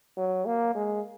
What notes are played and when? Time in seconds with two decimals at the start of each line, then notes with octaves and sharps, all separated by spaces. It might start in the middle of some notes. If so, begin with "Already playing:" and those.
0.17 F#3
0.46 A#3
0.75 G#3